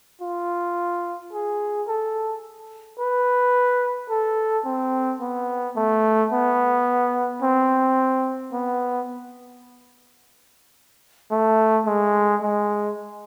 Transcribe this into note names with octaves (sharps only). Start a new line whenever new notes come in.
F4
G#4
A4
B4
A4
C4
B3
A3
B3
C4
B3
A3
G#3
G#3